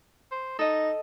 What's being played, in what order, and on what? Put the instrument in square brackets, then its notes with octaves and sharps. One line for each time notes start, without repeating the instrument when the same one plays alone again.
[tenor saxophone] C5
[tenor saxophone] D#4 [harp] A4 D#5